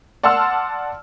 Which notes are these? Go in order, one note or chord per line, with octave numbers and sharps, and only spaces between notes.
D5 F#5 A5 C6 E6 F6